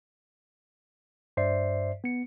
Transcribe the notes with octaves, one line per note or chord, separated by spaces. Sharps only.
G2 C5 D5 E5 C7
B3 C#7